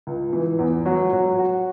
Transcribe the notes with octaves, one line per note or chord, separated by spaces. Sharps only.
C#2
E3
E2
F#3
F#3
F#4